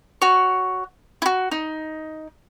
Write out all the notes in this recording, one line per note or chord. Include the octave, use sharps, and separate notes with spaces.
F#4 C#5
E4 F#4
D#4